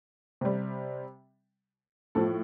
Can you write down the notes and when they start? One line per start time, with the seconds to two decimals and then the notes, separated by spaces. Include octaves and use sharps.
0.41 C3 G3
2.15 A2 F3 A4